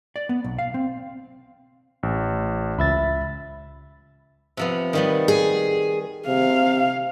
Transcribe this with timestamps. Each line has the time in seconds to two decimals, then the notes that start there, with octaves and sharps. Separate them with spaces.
0.16 D5
0.29 B3
0.44 B1
0.59 F5
0.74 C4
2.03 A1
2.79 C#2 E5 B5 A6
4.57 C3 F3 B3
4.93 D#3 G3 B3
5.28 G#4
6.28 C3 F5